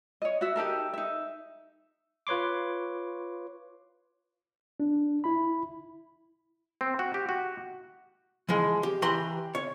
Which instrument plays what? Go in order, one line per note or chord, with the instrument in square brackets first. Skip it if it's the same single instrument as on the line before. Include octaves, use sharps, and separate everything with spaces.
[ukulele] C#5 D#5
F#4 E5
D#4 G4 A4 A#4
D#4 E5
[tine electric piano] F4 B4 C#5 C6 D6
[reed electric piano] D4
E4 B5
[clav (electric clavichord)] C4
F#4
G4
F#4
[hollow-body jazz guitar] E3 F3 G#3
G4
E3 G4 B4 A#5 C6
C#5